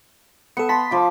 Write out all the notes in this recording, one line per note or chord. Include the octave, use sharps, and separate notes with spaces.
B3 A4 C#7
A5 B5 C6 B6
F3 D6